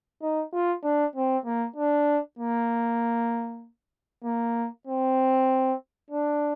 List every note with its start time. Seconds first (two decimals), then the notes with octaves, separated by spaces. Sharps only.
0.22 D#4
0.53 F4
0.83 D4
1.16 C4
1.45 A#3
1.76 D4
2.39 A#3
4.24 A#3
4.87 C4
6.10 D4